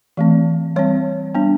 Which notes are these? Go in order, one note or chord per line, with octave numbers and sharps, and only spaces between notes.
E3 A3 C4
G3 C4 C#5
G3 B3 D4